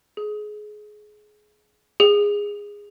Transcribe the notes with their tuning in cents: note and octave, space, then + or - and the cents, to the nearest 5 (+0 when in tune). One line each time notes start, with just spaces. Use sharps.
G#4 +25
G#4 -15